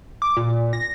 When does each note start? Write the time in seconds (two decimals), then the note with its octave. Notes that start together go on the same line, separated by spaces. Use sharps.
0.22 D6
0.37 A#2
0.73 A#6